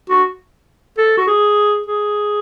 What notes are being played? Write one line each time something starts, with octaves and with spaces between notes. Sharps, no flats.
F#4
A4
F#4
G#4
G#4